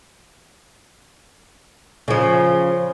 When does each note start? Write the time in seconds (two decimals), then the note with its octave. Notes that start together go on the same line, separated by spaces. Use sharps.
2.08 C#3 F3